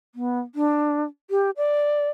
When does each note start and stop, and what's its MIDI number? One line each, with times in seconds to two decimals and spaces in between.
0.15 0.39 59
0.55 1.04 62
1.30 1.50 67
1.57 2.10 74